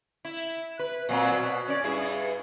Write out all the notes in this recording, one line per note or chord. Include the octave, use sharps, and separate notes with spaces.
E4
B4
A#2 F#3 C4
B2
C#4 D5
G2 E4 G#4